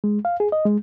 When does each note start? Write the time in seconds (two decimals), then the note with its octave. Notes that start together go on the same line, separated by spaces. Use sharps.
0.04 G#3
0.25 F5
0.40 G#4
0.52 D#5
0.66 G#3